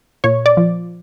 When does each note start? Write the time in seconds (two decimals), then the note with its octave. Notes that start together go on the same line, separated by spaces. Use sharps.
0.24 A#2 C#5
0.46 D5
0.57 F3